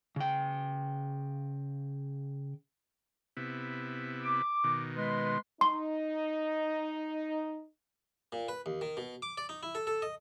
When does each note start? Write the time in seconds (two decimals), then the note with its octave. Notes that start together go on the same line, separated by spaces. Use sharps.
0.16 C#3 G5
3.37 C3 B3 E4
4.22 D6
4.64 B2 D#3
4.96 G#3 B4 C6
5.61 D#4 C6
8.32 A#2
8.49 B4
8.66 D#2
8.81 D#3
8.97 B2
9.22 D6
9.38 D5
9.49 D#4
9.63 E4
9.75 A4
9.87 A4
10.02 D#5